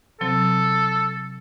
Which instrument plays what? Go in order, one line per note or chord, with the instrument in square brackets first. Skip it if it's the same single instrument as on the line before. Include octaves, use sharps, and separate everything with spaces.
[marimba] C3 F#3 C4 [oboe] A4